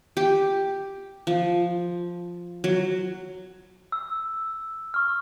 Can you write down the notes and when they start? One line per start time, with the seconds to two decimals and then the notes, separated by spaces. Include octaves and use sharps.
0.17 G4
1.27 F3
2.64 F#3
3.92 E6
4.94 C#6 F6